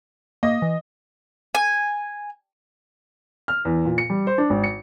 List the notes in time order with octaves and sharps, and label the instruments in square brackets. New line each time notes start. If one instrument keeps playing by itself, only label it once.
[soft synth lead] A#3 [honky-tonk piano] D#5
[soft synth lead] E3
[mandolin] G#5
[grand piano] F6
E2
A#2
C#7
G3
C5
D4
G#1
C#7